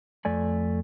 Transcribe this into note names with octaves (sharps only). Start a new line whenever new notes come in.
F2 A3 D5 G#5